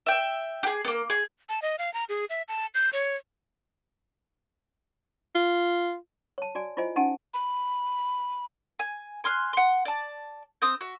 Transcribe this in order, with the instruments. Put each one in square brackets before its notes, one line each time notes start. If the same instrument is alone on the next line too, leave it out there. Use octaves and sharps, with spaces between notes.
[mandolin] E5 G5
G4 G#4
A#3 B3
G#4
[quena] A5
D#5
F5
A#5
G#4
E5
A5
G6
C#5
[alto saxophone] F4
[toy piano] C#5 A5
F#4 D5 G#5
E4 F4 C5 D#5 G#5
C#4 D#4 G4 F#5 G#5 A5
[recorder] B5
[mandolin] G#5
G#5 C6 F6 F#6
F#5 C6
D5 A5
C4 D#6 G6
F#4 E5